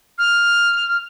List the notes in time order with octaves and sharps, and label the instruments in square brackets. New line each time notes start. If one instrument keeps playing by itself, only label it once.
[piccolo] F6